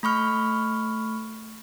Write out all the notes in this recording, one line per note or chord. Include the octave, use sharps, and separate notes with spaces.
A3 B5 C#6 F6